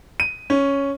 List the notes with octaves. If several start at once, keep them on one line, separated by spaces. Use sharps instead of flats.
D#7
C#4